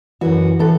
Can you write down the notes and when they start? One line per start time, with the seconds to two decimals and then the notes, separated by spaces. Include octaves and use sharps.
0.21 F#2 E3 F#4
0.59 E3 A4